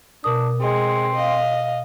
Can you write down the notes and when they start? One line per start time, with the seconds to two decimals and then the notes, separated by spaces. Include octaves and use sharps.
0.24 B2 D4 A#4 D#6
0.61 G#3 C4
1.16 D#5 F5